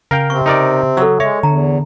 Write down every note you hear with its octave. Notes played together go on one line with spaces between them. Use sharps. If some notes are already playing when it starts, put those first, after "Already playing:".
C#3 A#4 F5 G5
C3 C4 C#6
D#4 A#4 D5
F#3 A4 E6
G#3 C#5 E5
E2 D3 A#5